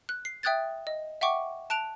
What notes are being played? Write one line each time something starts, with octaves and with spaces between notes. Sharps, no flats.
F#6
C7
E5 G5 D#6 F#6 G#6 A6
D#5
E5 F#5 G5 C#6 D6
A5 F#6 D7 F7